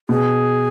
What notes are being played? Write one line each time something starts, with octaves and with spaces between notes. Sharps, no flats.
B2 G#4